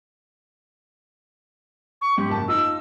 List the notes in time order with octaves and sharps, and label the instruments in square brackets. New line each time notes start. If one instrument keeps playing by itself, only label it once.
[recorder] C#6
[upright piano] G#2 [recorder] G4
[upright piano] F#1 A5
[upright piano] D#4 F4 [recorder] E6